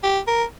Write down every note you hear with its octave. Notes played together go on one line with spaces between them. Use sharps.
G4
A#4